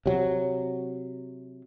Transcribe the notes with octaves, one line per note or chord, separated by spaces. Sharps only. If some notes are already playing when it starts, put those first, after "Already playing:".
C3 F#3